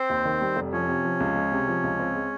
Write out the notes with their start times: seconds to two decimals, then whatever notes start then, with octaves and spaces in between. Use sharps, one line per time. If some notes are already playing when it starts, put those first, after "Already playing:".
Already playing: C4 C5
0.10 D#2
0.25 D#3
0.41 G3
0.56 F1
0.73 F3 C#4 C#5
0.88 C3
1.05 F3
1.20 C#2
1.36 G#3
1.52 C3
1.68 F3
1.84 C#2
1.99 C4
2.16 G#3